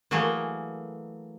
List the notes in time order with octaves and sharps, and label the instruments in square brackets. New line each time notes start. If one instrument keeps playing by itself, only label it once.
[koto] E3 F#3 A3 A#3 G#4